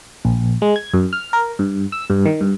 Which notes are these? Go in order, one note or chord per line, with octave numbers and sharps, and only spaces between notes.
A#1
G#3
G#6
F#2
F6
A#4
G2
E6
G2
D#3
G2